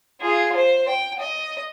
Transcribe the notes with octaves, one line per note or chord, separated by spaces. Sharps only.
F4 G#4
C5
G5
D#5